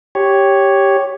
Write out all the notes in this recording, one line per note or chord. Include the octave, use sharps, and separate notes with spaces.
G4 C#5